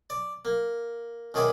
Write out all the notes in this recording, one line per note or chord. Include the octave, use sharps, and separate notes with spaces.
D5
A#3
C#2 D#3 G#4 D5 E5 B5